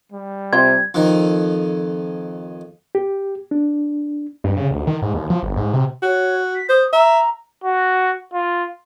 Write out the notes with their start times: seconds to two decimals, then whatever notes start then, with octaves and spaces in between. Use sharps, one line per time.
0.12 G3
0.53 C3 C4 F4 C5 G#6
0.94 F2 D#3
2.95 G4
3.51 D4
4.44 G2
4.57 C#3
4.71 D2
4.87 D#3
5.02 G#2
5.14 D#2
5.30 F3
5.43 G1
5.57 G#2
5.73 C3
6.03 F#4 C#5
6.55 B6
6.69 C5 D#6
6.93 E5 A#5
7.64 F#4
8.33 F4